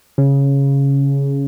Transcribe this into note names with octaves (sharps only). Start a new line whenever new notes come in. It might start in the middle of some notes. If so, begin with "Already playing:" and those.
C#3